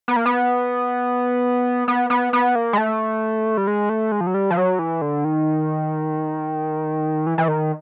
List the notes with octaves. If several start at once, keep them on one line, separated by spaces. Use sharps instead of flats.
B3
A#3
B3
B3
B3
B3
A#3
G#3
A3
G3
G#3
A3
G#3
F3
F#3
G3
F3
F#3
E3
D3
D#3
E3
E3
D#3